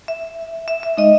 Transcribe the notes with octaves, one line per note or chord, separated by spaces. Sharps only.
E5
E5
E5
G#3 D#4 D#5